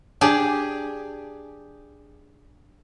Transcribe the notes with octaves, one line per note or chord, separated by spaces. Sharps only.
D4 G4 G#4